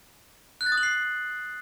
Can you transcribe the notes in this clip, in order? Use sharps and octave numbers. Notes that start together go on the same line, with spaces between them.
F#6
A6
D#6
F#7
C7